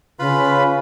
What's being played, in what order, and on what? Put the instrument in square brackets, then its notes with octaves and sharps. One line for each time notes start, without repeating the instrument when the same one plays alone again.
[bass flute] C#3 [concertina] F4 B4 B5